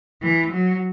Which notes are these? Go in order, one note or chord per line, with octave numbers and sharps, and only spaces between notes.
E3
F#3